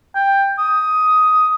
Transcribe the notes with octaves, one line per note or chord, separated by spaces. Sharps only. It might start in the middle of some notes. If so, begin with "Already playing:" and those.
G5
D#6